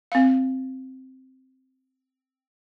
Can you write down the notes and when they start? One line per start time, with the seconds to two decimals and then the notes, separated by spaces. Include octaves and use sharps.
0.12 C4 F5